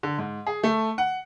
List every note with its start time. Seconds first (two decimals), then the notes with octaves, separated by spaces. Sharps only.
0.03 D3
0.18 G#2
0.47 G#4
0.63 A3
0.98 F#5